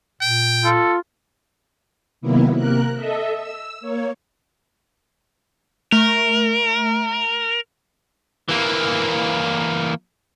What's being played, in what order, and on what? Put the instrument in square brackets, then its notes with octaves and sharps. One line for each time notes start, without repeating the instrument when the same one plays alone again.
[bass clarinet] A#2 [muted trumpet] G5
[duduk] F4 [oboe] A4
[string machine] C3 D#3 F#3 A#3 B3 E4
C3 A#3 A#4 F#6
A4 D#5 E5
E6
A#3 C#5
[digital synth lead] A3 [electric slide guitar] A#4
[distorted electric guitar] E3 A#3